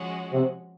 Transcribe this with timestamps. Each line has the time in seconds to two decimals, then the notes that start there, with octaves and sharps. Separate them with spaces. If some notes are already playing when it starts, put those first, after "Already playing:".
Already playing: F3 G#3 C#4 F#4
0.32 C3